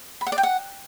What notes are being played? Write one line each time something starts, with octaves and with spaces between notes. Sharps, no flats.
B5
F#5
D5
G5
F#5